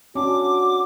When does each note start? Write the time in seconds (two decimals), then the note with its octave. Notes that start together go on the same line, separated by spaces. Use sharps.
0.15 C#4 D4 F#4 D6